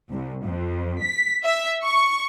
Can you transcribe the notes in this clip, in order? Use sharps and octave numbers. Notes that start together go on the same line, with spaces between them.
C2
F2
B6
E5
C#6